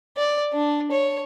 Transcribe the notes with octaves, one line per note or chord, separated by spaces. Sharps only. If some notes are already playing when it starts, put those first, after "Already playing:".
D5
D4
C#5